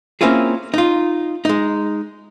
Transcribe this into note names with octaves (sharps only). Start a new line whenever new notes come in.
A#3 C4 C#4 E4 F4 G#4
D#4 F4
G#3 D#4